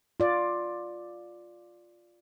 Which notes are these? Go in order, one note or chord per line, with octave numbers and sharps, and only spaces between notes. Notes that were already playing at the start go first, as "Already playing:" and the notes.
F4 D5